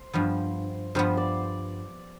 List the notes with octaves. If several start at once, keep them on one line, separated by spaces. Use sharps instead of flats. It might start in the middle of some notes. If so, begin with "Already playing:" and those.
Already playing: C5
G2 F3 B3
G2 F3 B3 C5
D5